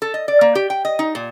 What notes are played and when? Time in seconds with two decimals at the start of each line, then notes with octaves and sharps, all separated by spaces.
0.02 A4
0.14 D#5
0.28 D5
0.41 A#3
0.55 G4
0.70 G5
0.85 D#5
0.99 D#4
1.15 A#2